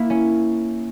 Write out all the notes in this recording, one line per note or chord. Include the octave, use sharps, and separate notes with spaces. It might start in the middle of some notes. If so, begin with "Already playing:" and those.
Already playing: A#3 E4
C#4